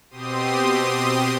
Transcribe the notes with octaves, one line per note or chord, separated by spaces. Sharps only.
B2 C4 G4 C6 D#6